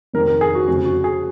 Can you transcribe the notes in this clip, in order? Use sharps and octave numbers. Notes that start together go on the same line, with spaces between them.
F1 F2 D#3 A#4
A#4
G#4
F#4
F1 F2 C#3 F#4
F#4
G#4